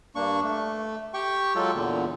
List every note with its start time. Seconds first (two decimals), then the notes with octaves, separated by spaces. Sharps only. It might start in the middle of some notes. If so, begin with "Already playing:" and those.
0.15 G2 A#3 D4 C#6
0.43 A3
1.14 G4 G5 C#6
1.55 F#3 G#3 F4 A4
1.75 E2 A#2 D3